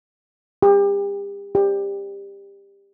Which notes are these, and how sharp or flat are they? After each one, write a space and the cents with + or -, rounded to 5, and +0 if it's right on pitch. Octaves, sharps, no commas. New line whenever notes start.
G4 +35
G4 +20